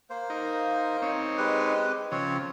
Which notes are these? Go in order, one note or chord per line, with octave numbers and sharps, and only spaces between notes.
A#3 C5
D#4 A#4
C4 D#4 C#5
G#3 G4 B4
C#3 F3 C4 C#5